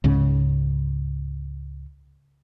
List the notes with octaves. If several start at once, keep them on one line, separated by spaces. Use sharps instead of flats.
C#2 G#2 C#3